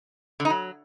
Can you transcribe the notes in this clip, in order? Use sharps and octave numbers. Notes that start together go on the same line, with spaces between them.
D3
D#4
F#3